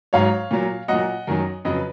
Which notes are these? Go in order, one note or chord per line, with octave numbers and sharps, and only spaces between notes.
G#2 F#3 C#5 F5
A#2 F#3
A#2 F#3 D#5 F#5
F#2 D#3 F#3
F2 C#3 F#3 B4 D#5